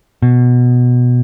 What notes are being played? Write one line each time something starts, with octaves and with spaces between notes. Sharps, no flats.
B2